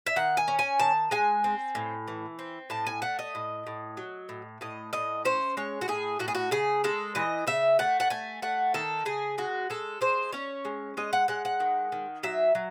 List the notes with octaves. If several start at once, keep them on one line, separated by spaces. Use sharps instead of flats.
E5
D#3 F#5
G#5
C#4
G#5
D#3 A5
G#3 G#5
C4
A2
E3
C4
A2 A5
G#5
A3 F#5
D#5
A2
A2
F#3
A2
A2 D#5
A2 D#5
C#4 C5
G#3 C#5
F#4
A2 G#4
A2 F#4
G#4
F#4
C#3 G#4
G#3 A4
E3 D#5
C#3 E5
A3 F#5
F#5
A3 G#5
A3 F#5
D#3 A4
C#3 G#4
G#3 F#4
G#3 A4
G#3 C5
C#4 C#5
G#3
G#3 D#5
F#5
G#3 F#5
F#5
D#3
D#3
F#3 E5
F#3